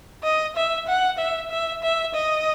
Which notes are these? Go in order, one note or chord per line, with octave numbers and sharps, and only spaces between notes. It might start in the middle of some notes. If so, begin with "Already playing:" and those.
D#5
E5
F#5
E5
E5
E5
D#5